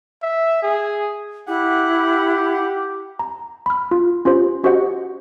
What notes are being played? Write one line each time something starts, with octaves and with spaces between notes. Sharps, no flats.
E5
G#4
E4 G4 F#5
A#5
B5 F6
F4
C#4 F4 G4 C5
C#4 F#4 G4 C5 D#5 F#5